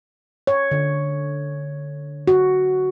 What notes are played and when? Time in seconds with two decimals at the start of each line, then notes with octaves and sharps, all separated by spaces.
0.47 C#5
0.71 D3
2.27 F#4